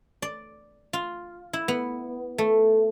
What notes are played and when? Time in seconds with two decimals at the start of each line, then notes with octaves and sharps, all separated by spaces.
0.22 D5
0.93 F4
1.53 E4
1.68 B3
2.38 A3